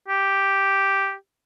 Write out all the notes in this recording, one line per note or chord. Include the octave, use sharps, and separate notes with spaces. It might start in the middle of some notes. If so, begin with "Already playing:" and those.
G4